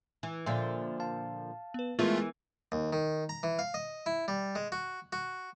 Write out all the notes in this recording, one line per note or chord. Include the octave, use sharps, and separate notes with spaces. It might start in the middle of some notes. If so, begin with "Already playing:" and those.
E3
A#2 D3 F3 D5 E5 C6 E6 A6
F5 A5
B3 B4
E3 G#3 A3 B3 F4 G#4 A#4
D#2
D#3
A#5
E3
F5
D#5
E4
G3
G#3
F#4
F#4